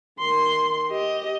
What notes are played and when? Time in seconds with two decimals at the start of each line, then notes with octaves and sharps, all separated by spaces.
0.19 D#3 C6
0.87 G4 D#5